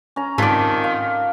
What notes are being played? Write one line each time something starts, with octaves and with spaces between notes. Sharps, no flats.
C#4 A#5
G#2 D#3 C4 D#4 F4 A4 D5 F#6
F5